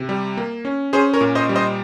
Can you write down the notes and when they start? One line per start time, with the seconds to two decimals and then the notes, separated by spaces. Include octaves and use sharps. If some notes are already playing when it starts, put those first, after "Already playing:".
Already playing: C3
0.09 G3
0.37 A#3
0.65 C#4
0.93 C#4 G#4 C5
1.14 A#4 C#5
1.21 A#2
1.35 C5 D#5
1.49 G3
1.56 C5 D#5